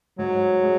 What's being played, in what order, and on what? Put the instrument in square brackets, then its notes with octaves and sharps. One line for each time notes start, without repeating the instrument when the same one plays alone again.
[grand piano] G#2 [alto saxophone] F#3
[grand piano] G#3